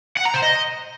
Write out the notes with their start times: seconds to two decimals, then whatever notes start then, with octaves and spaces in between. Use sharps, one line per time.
0.17 F#5
0.25 A#5
0.34 C5
0.42 D#5